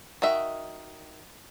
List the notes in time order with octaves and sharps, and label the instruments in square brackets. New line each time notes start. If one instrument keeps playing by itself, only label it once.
[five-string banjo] D#3 F#4 D#5 E5